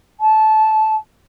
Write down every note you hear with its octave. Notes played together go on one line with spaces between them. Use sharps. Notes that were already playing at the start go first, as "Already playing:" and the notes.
A5